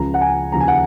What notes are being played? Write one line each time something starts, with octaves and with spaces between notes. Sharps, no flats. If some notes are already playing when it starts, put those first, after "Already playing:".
Already playing: C#2 C#3 F3 A#5
F#5
G#5
D#2 C#3 F3 A#5
G#5
F#5